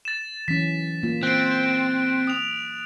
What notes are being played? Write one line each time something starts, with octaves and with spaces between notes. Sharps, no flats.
A6 E7
E3 F#3 C#4 B6
A#3 F4
C4 F#6 D7
D#6 F7